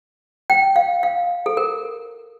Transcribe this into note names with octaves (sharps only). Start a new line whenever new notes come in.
G5
F5
F5
A4
A#4